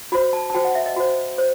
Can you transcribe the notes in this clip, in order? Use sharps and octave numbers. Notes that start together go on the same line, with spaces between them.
F#4 C5 B5
A5
A5
F#4 C5 G5
F#5
E5
D#5
F#4 C5
C5